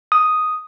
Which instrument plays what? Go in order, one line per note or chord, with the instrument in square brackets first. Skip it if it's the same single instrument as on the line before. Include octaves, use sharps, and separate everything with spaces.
[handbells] D#6